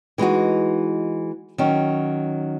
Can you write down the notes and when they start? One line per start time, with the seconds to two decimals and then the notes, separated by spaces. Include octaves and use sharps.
0.18 E3 G#3 D#4 F#4
1.58 D#3 F#3 C#4